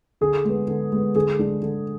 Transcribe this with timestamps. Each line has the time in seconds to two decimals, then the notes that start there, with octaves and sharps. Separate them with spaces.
0.21 D3 G#4
0.45 G#3 B3
0.68 D3
0.92 G#3 B3
1.15 D3 G#4
1.39 G#3 D4
1.63 D3